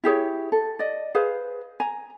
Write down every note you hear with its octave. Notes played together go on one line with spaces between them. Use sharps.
E4 G4 G#4 C#5
A4
D5 D#5
G#4 B4 C5 F5
G#5 A#5